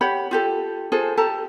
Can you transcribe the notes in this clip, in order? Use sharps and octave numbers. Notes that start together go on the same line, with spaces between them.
G4 C#5 F#5 B5
F4 G4 A4
F4 G#4 A4 C5
G4 A4 A5 A#5